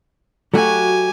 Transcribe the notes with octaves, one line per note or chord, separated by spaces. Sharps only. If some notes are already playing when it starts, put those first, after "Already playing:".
F#3 A3 F#4 G4 G#5